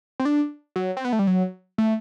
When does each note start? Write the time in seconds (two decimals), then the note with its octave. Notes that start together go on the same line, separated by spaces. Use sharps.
0.20 C4
0.25 D4
0.76 F#3
0.97 C4
1.05 B3
1.13 A3
1.19 G3
1.27 F#3
1.78 A3